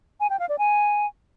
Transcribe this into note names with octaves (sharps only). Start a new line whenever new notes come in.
G#5
G5
F5
D5
G#5